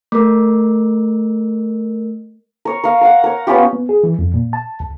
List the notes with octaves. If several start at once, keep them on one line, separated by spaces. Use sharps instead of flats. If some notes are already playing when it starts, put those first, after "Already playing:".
A3 A#4
A#4 C#5
A#4 F5
A#4 F5 F#5
A#4 C#5
B3 C#4 F4 G4
B3
G#4
E3
F2
A#2
A5
C#2